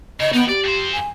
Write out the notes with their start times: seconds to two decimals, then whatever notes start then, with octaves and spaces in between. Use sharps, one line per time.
0.20 C#3 D#5
0.33 B3 D#4 G5
0.49 G4 D5
0.64 F2 C5
0.92 G#5